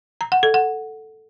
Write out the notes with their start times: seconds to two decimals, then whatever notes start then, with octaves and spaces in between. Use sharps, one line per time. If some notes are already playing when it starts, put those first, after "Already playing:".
0.21 A#5
0.32 F#5
0.43 A4
0.54 F#5